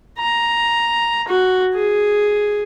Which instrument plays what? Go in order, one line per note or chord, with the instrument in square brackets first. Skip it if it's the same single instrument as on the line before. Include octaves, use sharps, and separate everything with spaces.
[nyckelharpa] A#5
F#4
G#4